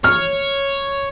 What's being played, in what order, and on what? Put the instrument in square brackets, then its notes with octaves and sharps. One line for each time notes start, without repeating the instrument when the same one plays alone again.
[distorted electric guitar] C#5 [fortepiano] F6